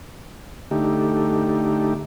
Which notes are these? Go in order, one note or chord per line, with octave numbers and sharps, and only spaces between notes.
D3 A3 D#4 G4